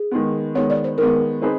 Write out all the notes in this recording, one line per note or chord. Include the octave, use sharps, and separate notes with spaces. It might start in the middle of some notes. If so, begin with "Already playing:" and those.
Already playing: G#4
D#3 G#3 B3
D#3 G#3 B3 C#5
D5
C5
D#3 G#3 B3 A#4
C4 D#4 G#4 B4